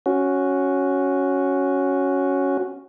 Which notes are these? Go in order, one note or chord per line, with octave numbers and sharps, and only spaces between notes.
C#4 F#4